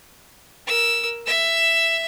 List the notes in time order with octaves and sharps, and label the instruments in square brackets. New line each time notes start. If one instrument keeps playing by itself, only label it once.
[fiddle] A#4 E6
E5 E6